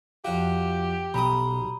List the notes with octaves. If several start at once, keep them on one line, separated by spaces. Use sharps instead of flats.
F2 F#4 G4 F5
B1 G3 A#5 B5 D#6